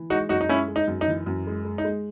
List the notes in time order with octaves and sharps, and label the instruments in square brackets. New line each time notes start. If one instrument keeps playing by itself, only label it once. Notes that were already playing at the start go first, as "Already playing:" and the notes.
Already playing: [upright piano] E3
[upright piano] G#3 [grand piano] D#4 F#4
[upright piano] F#2 [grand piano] D#4 F#4
[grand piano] D#4
[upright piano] G#3 [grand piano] C#4 E4
[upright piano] G#3
[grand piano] D#4
[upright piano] F#2
[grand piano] D#4
[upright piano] E3
F#2
G#3
G#3
[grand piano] D#4
[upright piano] G#3